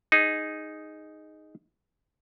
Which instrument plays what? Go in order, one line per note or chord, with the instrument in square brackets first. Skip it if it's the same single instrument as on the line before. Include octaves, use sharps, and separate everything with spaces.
[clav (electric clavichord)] D#4 G#4